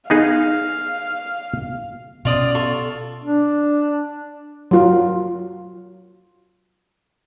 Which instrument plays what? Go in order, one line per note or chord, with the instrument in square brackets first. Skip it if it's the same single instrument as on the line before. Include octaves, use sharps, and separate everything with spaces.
[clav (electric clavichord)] B3 D#4 G#4 [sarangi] F5
[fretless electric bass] B2 C#4 [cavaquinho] F4 D5 D#6
[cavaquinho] F4 A4 C#6
[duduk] D4
[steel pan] F#3 F4